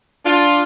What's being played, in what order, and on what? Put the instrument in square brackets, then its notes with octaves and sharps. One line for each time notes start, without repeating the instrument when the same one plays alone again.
[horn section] D4 F4